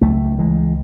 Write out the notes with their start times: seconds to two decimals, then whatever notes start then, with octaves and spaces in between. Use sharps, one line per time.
0.01 C#2 F#3 A3
0.38 C#2 E3 G#3